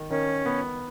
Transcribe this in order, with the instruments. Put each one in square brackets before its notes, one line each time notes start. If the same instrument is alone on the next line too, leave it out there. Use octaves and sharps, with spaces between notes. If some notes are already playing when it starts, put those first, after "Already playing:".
Already playing: [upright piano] D#3
[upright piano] D#3 [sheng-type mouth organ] C#4
[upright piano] B3